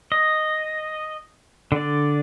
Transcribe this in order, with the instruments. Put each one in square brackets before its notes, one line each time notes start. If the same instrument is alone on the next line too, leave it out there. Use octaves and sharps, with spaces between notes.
[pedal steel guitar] D#5
D3 D5